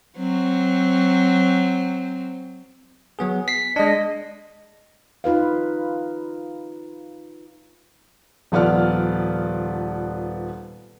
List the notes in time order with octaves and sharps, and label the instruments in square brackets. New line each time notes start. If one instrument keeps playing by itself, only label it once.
[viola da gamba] F#3 C4
[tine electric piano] F#3 B3 G#4
B6 C7
[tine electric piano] G#3 D4 [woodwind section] D#5
[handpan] D#4 F4 B4 F5
[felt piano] D#1 F3 B3 D5 F6